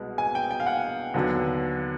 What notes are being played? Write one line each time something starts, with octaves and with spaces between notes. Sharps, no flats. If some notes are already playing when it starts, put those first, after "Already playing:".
Already playing: C2 B2 G#3
G#5
G5
G5
F5
F#5
D#2 D3 F#3 B3